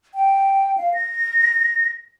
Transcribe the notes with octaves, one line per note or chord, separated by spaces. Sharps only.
G5
F5
A#6